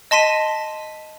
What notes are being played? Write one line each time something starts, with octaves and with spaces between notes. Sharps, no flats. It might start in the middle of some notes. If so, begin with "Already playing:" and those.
D#5 A5 C6 B6 D#7